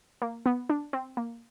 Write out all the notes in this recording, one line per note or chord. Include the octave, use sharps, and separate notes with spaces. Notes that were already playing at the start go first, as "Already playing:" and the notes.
A#3
B3
D4
C4
A#3